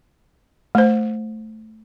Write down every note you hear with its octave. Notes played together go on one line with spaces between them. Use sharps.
A3 C5